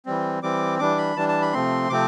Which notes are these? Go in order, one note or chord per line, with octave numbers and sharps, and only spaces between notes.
E3 G3 C4
E3 G3 C4 D6
E3 G3 D4 D6
B5
E3 G3 D4 A5
A5
B5
C3 F3 A3 C4 C6
C3 F3 A3 C4 D6